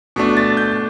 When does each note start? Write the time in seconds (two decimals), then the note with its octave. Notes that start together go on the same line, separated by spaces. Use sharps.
0.16 B2 A3 D4
0.37 A6
0.57 G6